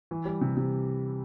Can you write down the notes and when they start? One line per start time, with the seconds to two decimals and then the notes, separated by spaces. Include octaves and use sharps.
0.11 E3
0.25 G3
0.41 C3
0.57 C3